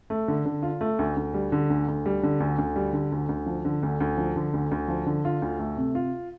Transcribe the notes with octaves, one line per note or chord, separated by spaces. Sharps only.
A3
D3
D3
F4
A3
D2
D2
G3
D3
D2
D2
G3
D3
D2
D2
G3
D3
D2
D2
F3
D3
D2
D2
F3
D3
D2
D2
F3
D3
F4
D2
A3
C3
F4